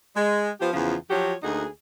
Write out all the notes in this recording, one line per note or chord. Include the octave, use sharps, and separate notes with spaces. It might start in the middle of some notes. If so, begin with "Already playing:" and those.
G#3
F3 B3 F4 G4 C5
E2 C#3 F3 C#4 F4
F3 F#3 F#4 G4 C#5
D2 A#3 D#4 F#4 G#4